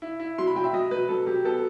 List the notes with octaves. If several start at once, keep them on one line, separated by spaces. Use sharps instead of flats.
E4
E4
F#3 C6
B5
F#3 G5
E5
F#3 D#5
F#3 B4
F#3 A4
F#3 G4
B3 A4